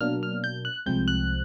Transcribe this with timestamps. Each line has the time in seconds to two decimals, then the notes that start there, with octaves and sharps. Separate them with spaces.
0.01 B2 F#3 A#3 D4 F6
0.23 F6
0.44 G6
0.65 F#6
0.86 C2 C3 F3 G#3 C4 G6
1.08 F#6